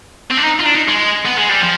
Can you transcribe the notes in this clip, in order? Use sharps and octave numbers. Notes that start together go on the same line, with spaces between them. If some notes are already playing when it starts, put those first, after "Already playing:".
C4
D4
D#4
F4
D4
D#4
G#3
B3
G#3
G3
F3